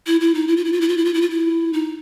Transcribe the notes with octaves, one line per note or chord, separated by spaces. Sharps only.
E4
E4
D#4
E4
F4
E4
F4
E4
F4
E4
F4
E4
F4
E4
D#4